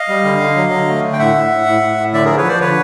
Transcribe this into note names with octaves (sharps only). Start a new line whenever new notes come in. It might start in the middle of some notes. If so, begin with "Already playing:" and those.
Already playing: D#5 F5
G3
D3
D3
F#3
D3
A3
D3
G5
A2 E5 F#5
A2
A2
A2
A2
A2
D3 D5 E5
F3 G#4 A#4
B4 C#5
F3 C5 D5
D3 B4 C#5